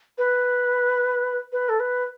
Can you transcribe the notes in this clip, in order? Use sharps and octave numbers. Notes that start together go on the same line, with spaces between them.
B4
B4
A4
B4